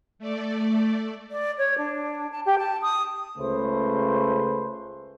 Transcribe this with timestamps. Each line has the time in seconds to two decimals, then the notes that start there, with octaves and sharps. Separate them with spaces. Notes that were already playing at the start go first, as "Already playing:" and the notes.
0.19 A3 D5
1.31 D5
1.58 C#5
1.77 D4
2.31 A5
2.45 G4
2.58 A5
2.82 D#6
3.38 C#2 C#3 A3 B4 C5